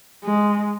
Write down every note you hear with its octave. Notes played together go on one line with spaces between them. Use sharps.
G#3